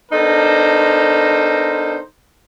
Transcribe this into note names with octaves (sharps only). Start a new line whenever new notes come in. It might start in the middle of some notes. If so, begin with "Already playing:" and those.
B3 D4 D#4 A4 A#4 C5